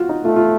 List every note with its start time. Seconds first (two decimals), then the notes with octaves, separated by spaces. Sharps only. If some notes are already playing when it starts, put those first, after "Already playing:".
Already playing: F4 F#4
0.09 D#4
0.24 A3 F4
0.36 F4